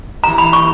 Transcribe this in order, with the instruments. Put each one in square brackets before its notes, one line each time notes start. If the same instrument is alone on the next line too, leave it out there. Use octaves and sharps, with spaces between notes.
[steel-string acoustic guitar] E3 G3 A#3 [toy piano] A#5
[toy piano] B5
C#6